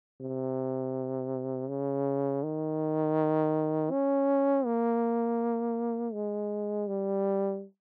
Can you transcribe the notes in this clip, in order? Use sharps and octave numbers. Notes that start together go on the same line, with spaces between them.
C3
C#3
D#3
C#4
A#3
G#3
G3